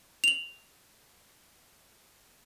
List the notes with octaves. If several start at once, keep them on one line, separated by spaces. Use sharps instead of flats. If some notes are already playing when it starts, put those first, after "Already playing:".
F7 F#7